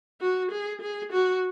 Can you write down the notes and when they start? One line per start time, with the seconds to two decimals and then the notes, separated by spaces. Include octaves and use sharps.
0.21 F#4
0.51 G#4
0.81 G#4
1.12 F#4